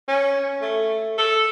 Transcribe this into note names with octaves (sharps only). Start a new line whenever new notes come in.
C#4
A3
A4